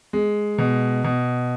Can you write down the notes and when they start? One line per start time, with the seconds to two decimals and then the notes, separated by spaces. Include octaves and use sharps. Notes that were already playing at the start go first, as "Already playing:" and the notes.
0.13 G#3
0.58 B2
1.04 B2